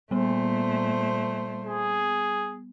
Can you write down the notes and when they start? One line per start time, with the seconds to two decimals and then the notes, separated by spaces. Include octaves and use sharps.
0.11 A#2 G3 A3 B3 C5
1.65 G#4